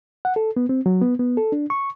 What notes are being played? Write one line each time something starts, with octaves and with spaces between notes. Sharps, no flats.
F#5
A4
B3
C4
F#3
B3
B3
A4
D4
C#6